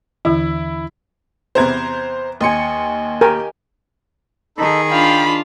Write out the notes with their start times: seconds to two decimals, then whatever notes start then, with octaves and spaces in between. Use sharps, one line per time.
0.25 D#2 D3 E3 E4
1.55 E2 C3 B3 C5 A#5 G#6
2.41 D#2 D#5 G#5 C6 C#7
3.21 G4 A#4 G5 G#5
4.58 D#3 D#4 G#4 A4 B5
4.91 D4 F4 F5 G5 B5